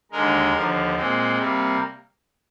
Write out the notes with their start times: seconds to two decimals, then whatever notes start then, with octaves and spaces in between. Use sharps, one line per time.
0.11 D#2 D3 G#3 A#4
0.53 D#2 D3 F3
0.96 A#2 G#3 C4
1.38 C3 G3 A#3